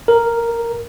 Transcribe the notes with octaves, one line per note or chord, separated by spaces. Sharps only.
A#4